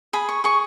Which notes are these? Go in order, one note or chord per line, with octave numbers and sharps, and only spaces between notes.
G#4 B5
C#6
G#4 C#6